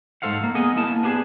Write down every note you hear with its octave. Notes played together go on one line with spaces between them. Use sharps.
G#2 G3 A4 C5 F5 F#5
D#3 A#3
B3 G#4 A#4 D#5 F#5 G#5
A#3 E4 A#4 A5
B3 D4 G4 G#4